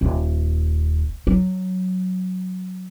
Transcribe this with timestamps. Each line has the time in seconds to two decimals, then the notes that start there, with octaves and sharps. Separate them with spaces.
0.01 D#1
1.27 F#3